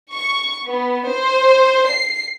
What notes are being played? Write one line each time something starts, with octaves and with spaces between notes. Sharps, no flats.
C#6
B3
C5
C7